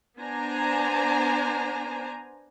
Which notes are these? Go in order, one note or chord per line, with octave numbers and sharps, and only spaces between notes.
B3 D4 C5 G#5 A#5